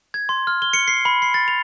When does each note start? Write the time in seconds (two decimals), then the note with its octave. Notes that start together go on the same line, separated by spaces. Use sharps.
0.14 G#6
0.29 C6
0.47 F6
0.62 G7
0.73 C#7
0.88 C7
1.05 B5
1.22 C7
1.34 A6
1.48 F7